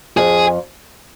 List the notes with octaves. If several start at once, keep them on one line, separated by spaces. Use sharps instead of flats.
F2 G#4